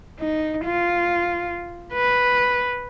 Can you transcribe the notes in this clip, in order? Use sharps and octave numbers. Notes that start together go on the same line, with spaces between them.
D#4
F4
B4